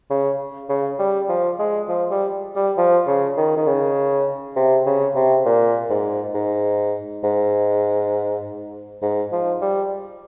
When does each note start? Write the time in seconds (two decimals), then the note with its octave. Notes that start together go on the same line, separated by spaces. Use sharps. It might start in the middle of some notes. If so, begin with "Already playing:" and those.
0.10 C#3
0.69 C#3
0.99 G3
1.29 F3
1.59 G#3
1.89 F3
2.11 G3
2.56 G3
2.78 F3
3.07 C#3
3.37 D#3
3.57 D#3
3.67 C#3
4.56 C3
4.86 C#3
5.15 C3
5.45 A#2
5.90 G#2
6.34 G#2
7.24 G#2
9.02 G#2
9.32 F3
9.61 G3